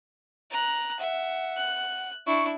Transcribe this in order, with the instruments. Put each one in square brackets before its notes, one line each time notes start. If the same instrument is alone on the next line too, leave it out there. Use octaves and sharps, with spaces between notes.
[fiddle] A#5 F#6
[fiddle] E5 [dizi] F#5
[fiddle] F#6
[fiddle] D4 E4 [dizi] C#6